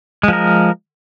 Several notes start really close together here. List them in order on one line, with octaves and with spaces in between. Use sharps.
G#3 F3 A#4